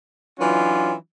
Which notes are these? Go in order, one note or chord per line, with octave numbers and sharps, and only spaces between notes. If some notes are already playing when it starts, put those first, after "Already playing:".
E3 F#3 C#4 D4 F4